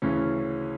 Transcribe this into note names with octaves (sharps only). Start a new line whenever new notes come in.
D2 C#3 E3 C#4